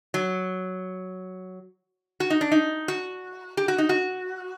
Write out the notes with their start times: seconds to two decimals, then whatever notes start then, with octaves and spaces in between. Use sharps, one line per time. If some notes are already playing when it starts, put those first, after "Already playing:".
0.14 F#3
2.20 F#4
2.30 D#4
2.41 D4
2.52 D#4
2.88 F#4
3.57 G4
3.68 F#4
3.78 D#4
3.89 F#4